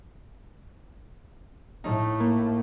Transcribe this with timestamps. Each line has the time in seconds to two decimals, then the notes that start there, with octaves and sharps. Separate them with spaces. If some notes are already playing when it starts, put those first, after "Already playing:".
1.84 A2 A3 D#4
2.20 A#3